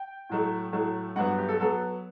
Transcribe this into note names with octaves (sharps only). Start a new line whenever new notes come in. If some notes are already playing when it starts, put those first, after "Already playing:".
Already playing: G5
A2 F#3 A3
A2 F#3 A3
G2 F#3 B3 F#5
G4
A4
F#3 B3 A4